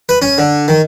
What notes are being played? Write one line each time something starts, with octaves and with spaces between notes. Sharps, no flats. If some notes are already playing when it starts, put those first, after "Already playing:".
B4
C#4
D3
D#3